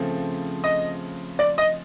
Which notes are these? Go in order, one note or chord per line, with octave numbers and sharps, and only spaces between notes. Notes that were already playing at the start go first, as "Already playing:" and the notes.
Already playing: C#3 F3 A3 C4
D#5
D5
D#5